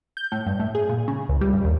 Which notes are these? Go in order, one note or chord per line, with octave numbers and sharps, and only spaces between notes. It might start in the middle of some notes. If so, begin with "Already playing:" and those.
G6
A2
G2
A2
G#4
A#2
C#3
C#2
G3
G2
D#2